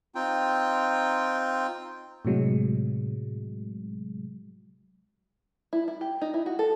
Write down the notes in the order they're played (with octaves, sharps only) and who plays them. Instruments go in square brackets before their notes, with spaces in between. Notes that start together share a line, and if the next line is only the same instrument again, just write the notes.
[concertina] C4 D#4 F4 G5
[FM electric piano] A2 C3 F#3 G#3
[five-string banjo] E4
E4
G4
D#4
E4
F#4
A4